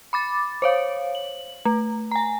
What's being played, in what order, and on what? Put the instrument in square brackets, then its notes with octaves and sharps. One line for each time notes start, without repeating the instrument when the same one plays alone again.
[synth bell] B5 D6 A6
C5 C#5 F5
F#7
A3
G#5 A#5